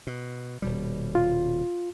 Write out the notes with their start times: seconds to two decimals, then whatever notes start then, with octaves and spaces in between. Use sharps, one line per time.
0.07 B2
0.62 D#1 B2 G3
1.15 F4